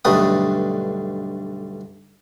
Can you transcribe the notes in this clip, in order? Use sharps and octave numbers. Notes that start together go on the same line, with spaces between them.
B1 G2 D3 A3 B4 D#6